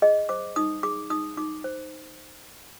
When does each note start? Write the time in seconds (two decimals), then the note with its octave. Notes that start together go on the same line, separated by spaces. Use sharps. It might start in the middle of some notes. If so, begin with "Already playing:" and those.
0.02 G#4 D#5
0.29 C5 D6
0.56 D#4 D#6
0.83 G#4 D6
1.10 D#4 D#6
1.37 D#4 D6
1.64 C5